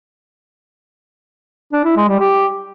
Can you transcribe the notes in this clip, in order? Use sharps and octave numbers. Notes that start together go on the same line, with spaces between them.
D4
E4
G#3
G3
G4